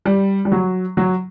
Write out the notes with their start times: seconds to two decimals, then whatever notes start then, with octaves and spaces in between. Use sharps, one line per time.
0.05 G3
0.45 G3
0.52 F#3
0.97 F#3